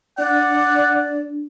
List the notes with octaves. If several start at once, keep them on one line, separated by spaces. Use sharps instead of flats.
D4 D5 F#5